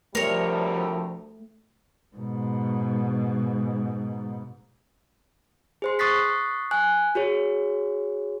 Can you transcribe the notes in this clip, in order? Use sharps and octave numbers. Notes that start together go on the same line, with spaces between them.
D2 C3 F3 G3 A3 A#4 C#5
G#2 B2
G#4 C5 C6
C#6 D#6 F#6 A6 B6 C7
G#5 F#6
F#4 G#4 C#5